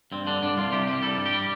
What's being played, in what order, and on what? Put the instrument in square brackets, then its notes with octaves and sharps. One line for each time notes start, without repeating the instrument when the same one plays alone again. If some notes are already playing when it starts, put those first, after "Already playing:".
[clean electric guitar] G2 C4
D3 D4
G2 D4
C2 F4
C3 G4
C2 G4
G3 A4
G2
G4
G3